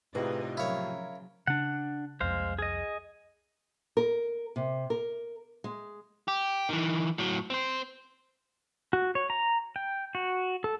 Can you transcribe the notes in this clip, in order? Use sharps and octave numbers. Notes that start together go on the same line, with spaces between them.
A2 C3 D#4 F4 G#4 B4 D5 D#5
C#3 F3 F#3 E4 A#4 C#5 F5
C#3 D4 F#5
C2 F2 F3 G#3 C5 F5
G#4 D#5
A#4
C3
A#4
G#3
G4
D#3 E3
A2 F#3
C4 C5
F#4
C#5
A#5
G5
F#4
A4